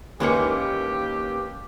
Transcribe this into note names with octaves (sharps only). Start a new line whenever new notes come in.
D#2 E3 G#3 A#3 C#4 G4 B4 C#7